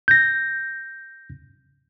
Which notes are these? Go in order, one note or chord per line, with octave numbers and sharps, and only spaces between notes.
G6 A#6